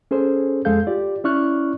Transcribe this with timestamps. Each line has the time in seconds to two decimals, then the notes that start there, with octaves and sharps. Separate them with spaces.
0.11 C#4 G#4 A4 C5
0.65 F2 G#3 G#4 A4 F5 G6
0.87 F4 G4 D5
1.24 C#4 E4 D5 C#6 F6 F#6